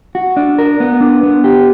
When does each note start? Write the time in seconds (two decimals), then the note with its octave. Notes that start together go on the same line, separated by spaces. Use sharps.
0.15 F#4
0.37 D4
0.58 A#4
0.80 B3
1.01 D4
1.23 B3
1.44 G4